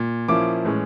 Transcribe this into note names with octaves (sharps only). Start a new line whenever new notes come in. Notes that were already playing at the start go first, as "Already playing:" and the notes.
Already playing: A#2
A#2 F3 A#3 C#4 E4 D6
A2 E3 G#3 C#4